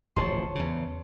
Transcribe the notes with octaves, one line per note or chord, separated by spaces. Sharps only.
D1 A1 F3 C#5 A5 C6
E2 C#3